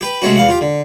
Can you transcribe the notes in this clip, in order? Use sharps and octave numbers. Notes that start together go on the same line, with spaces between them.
G4 B4
C3 G#3 A3 C#4 F#4
E2 F5 F#5
F4 G4
D3